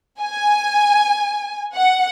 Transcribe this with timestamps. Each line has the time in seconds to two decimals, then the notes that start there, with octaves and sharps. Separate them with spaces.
0.21 G#5
1.75 F#5